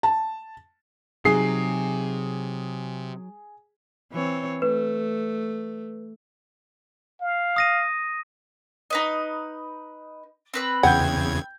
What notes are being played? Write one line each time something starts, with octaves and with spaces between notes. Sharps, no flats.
A5
C3 F#3 D#4 G#4 C7
E3 C4 C#5
A3 B4
F5
D#6 A#6 D#7
D#4 B4 D#5
C4 B4 E6
E2 C#3 F#5 G5 G6 G#6